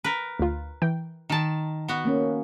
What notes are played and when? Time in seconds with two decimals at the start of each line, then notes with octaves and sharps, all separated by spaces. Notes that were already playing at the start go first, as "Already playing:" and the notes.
0.04 A#4 B4
0.39 D2 F4
0.82 E3 G5
1.30 D#3 A5
1.88 B3 F#4
2.05 A#3 C#4